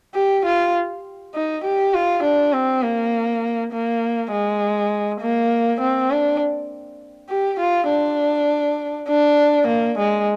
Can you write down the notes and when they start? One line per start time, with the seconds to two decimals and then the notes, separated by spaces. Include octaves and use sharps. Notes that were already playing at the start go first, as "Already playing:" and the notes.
0.15 G4
0.45 F4
1.34 D#4
1.64 G4
1.94 F4
2.23 D4
2.53 C4
2.83 A#3
3.73 A#3
4.32 G#3
5.21 A#3
5.81 C4
6.11 D4
7.29 G4
7.60 F4
7.89 D4
9.09 D4
9.68 A#3
9.98 G#3